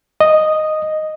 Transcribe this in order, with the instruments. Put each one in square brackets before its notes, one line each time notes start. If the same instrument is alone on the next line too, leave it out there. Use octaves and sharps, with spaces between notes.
[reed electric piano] D#5